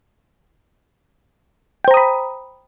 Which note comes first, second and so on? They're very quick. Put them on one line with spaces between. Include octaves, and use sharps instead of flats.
G5 C5 A#5 D#6 B5